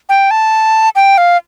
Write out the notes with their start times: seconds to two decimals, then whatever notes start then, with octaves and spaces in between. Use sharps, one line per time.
0.09 G5
0.31 A5
0.96 G5
1.18 F5